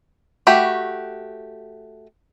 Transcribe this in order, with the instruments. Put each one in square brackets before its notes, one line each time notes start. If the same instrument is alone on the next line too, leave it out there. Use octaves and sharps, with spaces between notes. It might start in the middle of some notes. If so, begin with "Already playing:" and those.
[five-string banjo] A3 F#4 G4 G5 B5